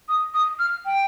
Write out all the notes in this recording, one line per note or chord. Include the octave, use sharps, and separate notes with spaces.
D#6
D#6
F6
G5